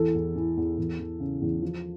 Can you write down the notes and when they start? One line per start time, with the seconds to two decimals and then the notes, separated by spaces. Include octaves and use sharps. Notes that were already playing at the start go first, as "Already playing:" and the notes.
Already playing: E2 E3 A4
0.15 E2
0.36 E3
0.57 E2
0.78 E2
0.99 E3
1.20 C#3
1.41 E2
1.62 F3